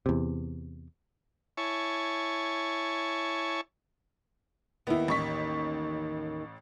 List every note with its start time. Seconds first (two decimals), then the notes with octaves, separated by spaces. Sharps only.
0.06 E2 C3
1.57 E4 C#5 G#5 A5 C#6
4.87 D#2 D#3 B3 E4
5.08 A1 C#6 B6